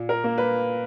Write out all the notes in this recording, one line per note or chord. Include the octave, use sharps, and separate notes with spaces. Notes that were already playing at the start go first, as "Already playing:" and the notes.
Already playing: A#2
A#4
A#3
B4